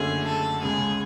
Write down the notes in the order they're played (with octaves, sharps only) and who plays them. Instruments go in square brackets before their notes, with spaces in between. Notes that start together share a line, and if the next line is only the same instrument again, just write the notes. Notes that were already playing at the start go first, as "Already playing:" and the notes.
Already playing: [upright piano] F#1 F#2 D3 A3 C#4 [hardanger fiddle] G#4
[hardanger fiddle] A4
[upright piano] C#2 C#3 G#3 C#4 [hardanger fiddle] G#4